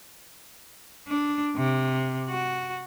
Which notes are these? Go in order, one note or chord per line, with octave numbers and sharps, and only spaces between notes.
D4
C3
F#4